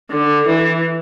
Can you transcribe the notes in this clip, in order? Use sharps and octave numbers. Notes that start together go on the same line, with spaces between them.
D3
E3